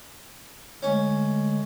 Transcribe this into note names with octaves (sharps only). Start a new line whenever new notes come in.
D3 G#3 A3 C#4